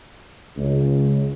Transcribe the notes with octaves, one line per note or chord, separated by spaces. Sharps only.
C#2